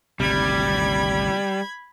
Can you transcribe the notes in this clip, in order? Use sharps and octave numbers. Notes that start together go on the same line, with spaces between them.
G#1 D2 C3 G3 B5 G#6